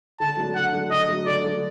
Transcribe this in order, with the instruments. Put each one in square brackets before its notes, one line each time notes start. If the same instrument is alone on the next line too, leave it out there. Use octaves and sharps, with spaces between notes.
[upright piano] D3 [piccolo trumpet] A5
[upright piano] F#3 A3 D4
[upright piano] D3 [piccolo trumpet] F#5
[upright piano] F#3 A3 D4
[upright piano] D3 [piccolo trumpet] D#5
[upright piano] F#3 A3 D4
[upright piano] D3 [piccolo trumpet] D5
[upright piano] F#3 A3 D4